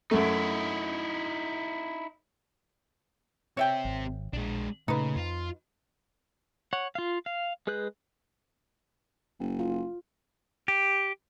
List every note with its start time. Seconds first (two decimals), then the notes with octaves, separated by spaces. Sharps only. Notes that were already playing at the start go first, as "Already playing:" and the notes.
0.11 F#2 A3 D#4 E4
3.57 C4 G4 C#5 E5 G5
3.85 G#1
4.33 A#1 G#3 D4
4.88 A#2 C#3 A3 D#4 B4
5.16 F2 F4
6.73 C#5 F#5
6.95 F4 F5
7.26 F5
7.67 G#3 G#4 B4 F#6 G6
9.39 F#1
9.59 F4
10.68 G4